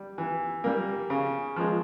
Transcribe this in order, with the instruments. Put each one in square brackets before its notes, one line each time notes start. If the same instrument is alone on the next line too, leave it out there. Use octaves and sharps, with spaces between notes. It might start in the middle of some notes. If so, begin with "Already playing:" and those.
Already playing: [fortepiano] G3
E3
G3 A#3
C#3
F3 G#3